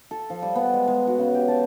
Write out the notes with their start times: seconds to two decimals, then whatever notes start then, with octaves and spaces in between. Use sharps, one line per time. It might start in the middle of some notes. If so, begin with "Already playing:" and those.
0.11 A4
0.30 F3
0.42 G3
0.55 B3
0.74 G#3
0.88 G#3
1.07 F#4
1.18 C#3
1.35 G4
1.48 A5